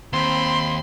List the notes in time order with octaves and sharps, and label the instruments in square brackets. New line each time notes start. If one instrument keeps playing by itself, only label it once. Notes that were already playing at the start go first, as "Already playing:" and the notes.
[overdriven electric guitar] D#2 [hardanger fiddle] C4 B5 [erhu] C6